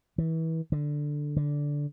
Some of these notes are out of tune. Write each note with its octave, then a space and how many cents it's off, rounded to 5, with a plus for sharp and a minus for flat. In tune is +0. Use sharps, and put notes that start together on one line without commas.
E3 -30
D3 +5
D3 -10